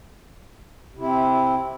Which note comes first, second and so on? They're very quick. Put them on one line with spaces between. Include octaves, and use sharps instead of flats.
C3 E4 C4